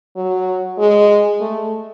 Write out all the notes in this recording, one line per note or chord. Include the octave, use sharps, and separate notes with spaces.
F#3
G#3
A3